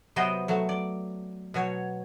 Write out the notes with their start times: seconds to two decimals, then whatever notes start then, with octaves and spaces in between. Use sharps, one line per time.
0.16 C3 F#3 B3 C5 D#5 G5
0.48 F#3 A3 A5
0.69 D5
1.54 B2 F#3 C#5